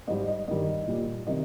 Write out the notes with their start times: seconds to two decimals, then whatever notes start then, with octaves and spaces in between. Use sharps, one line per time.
0.07 G#2 G3 D#5
0.28 D#5
0.48 G2 D#3 G3 D#5
0.88 A#2 G3
1.27 C3 D#3 G3 D#5